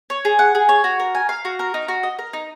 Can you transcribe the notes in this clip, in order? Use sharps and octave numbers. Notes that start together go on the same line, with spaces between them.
C#5
G#4
F#5
G#4
C#5
F#4
A#4
G#5
F5
F#4
A#4
D#4
F#4
D#5
A#4
D#4